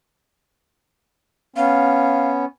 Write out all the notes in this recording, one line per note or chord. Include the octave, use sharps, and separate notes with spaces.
B3 C#4 F5